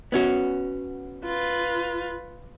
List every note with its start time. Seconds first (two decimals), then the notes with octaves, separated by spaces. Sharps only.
0.12 B3 C#4 F#4
1.25 F4 B4